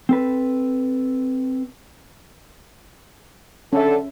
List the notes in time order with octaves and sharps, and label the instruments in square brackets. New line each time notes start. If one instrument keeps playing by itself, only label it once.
[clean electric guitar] C4 A4 B4
[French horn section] D3 A4 [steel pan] C#4 E5